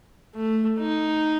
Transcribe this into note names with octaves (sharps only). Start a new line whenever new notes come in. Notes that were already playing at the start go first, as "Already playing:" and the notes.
A3
D#4